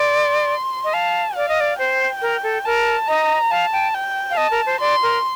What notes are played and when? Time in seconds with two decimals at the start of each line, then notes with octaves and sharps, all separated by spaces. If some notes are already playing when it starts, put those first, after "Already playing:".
Already playing: D5 C6
0.84 D#5
0.94 F5 A5
1.35 D5 F5
1.49 D#5
1.60 D5
1.79 C5 G5
2.22 A#4
2.43 A4
2.65 A#4 A5
3.08 D#5 A#5
3.51 F5 A5
3.73 G5
3.95 G5
4.30 F5
4.37 D#5 A5
4.51 A#4
4.66 C5
4.80 D5 C6
5.03 A#4